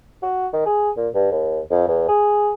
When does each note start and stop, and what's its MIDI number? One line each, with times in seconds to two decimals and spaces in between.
0.23 0.47 66
0.53 0.64 51
0.66 0.90 68
0.97 1.08 46
1.15 1.30 43
1.31 1.60 39
1.71 1.84 41
1.88 2.07 40
2.08 2.53 68